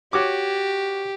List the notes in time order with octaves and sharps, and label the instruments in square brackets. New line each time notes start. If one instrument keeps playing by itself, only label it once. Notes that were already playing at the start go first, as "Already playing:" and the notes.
[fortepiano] F#4 C#5 D6 [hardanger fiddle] G4